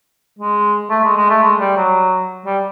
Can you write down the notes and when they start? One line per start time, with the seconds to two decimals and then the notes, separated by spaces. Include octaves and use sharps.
0.39 G#3
0.90 A3
1.04 G#3
1.16 G#3
1.29 A3
1.42 G#3
1.60 G3
1.77 F#3
2.46 G3